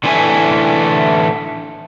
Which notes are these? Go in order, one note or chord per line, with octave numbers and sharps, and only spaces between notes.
D3 E3 A3 E4 G#5